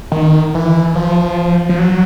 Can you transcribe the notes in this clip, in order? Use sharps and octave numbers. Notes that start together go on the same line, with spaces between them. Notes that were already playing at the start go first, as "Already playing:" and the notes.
D#3
E3
F3
F3
F#3